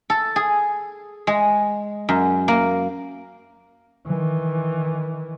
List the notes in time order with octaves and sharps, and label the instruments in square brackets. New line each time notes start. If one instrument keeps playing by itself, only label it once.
[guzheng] A4
G#4
G#3
F#2
A#3
[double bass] D#3 E3